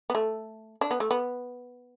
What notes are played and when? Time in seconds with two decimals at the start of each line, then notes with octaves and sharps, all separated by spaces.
0.10 B3
0.15 A3
0.81 D4
0.91 B3
1.00 A3
1.11 B3